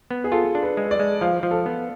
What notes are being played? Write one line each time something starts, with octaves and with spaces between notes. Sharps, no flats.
B3
G#4
F4 A4
D4
B4
G#3
D5
G#3
F3 F5
F3
A4
B3